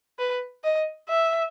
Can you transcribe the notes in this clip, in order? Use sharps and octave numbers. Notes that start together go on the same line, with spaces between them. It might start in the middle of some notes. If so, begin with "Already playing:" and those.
B4
D#5
E5